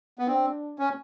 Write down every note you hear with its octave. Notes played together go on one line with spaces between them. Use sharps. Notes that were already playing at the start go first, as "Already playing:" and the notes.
B3
C4 D4
C#4